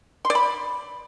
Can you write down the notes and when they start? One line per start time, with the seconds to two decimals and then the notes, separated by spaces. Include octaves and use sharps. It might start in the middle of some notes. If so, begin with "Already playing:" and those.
0.25 C6
0.30 D5
0.35 B5